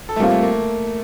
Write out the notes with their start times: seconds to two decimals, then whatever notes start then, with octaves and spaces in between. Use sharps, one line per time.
0.09 A4
0.16 A3
0.20 G3 A#3 C4 F4
0.31 A3
0.42 A#3